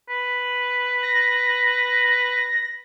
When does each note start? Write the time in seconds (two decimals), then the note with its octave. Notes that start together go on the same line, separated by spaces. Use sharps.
0.09 B4
1.03 A#6